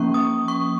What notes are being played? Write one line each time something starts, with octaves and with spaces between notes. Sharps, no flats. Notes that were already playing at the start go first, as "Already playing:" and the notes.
Already playing: F3 A#3 C#4 C#6
D#6
C#6